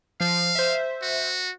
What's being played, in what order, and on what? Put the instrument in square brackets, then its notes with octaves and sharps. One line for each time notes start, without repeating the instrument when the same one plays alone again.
[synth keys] F3 [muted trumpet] F5
[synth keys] C5 E5
[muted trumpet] F#4